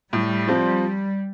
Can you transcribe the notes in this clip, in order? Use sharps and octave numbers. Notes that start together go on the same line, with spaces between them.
A2 G3
F3 C4